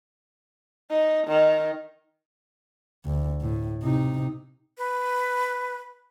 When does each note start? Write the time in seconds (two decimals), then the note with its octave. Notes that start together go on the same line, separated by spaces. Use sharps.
0.90 D#4
1.27 D#3
3.05 D2
3.41 A2
3.83 C3 D#4
4.78 B4